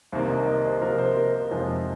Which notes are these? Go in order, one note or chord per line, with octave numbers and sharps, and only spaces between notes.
C2 C3 D#3 A#3 C5
D#5
D#5
C5
C3 F3 A#3 A#4
C5
A#4
F2 C3 F3 G#3 D#4